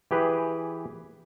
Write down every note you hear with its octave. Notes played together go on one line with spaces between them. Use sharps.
E3 G4 G#4 B4